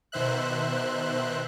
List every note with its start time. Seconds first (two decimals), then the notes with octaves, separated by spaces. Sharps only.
0.12 B2 D#3 C5 E5 F#6